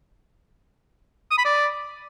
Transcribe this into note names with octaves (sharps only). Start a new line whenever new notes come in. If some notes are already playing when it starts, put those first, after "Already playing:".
D#6
B5
D5